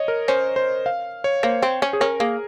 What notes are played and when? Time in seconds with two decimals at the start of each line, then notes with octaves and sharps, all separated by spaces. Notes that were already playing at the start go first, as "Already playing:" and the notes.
Already playing: C#5 D#5
0.08 A#4
0.28 C#4 C5
0.56 C5
0.86 F5
1.24 C#5
1.43 A#3 C5
1.62 C4
1.82 C#4
1.93 G#4
2.01 C#4 A#4
2.20 A#3 G#4